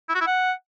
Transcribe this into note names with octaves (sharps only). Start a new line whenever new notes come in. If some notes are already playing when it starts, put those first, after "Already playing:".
E4
F#4
E4
F#5